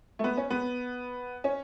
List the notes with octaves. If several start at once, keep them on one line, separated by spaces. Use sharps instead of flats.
A3
B3
C#4
B3
C#4